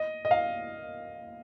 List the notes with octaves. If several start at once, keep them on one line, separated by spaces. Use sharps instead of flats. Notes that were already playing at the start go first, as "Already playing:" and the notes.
Already playing: D#5
D#5
F5